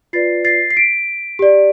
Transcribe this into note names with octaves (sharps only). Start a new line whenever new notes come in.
F4 B4 D5 A6 C7
A6 C7
C7
B6 D7
G4 D5